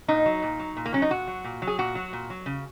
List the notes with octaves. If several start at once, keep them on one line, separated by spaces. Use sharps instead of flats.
A#2 D#4
F#3
A#2
F#3
A#2
A#3
F#3 C#4
D#4
A#2 F#4
F#3
A#2
F#3
G#4
A#2 F#4
F#3
A#2
F#3
C#3